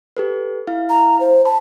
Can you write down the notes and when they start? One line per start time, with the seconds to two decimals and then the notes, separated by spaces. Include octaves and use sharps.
0.17 G4 A4 B4
0.67 E4 F5
0.89 A#5
1.20 C5
1.45 A5 B5